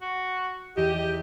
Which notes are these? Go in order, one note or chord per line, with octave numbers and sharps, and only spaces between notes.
F#4
E2 G4 D#5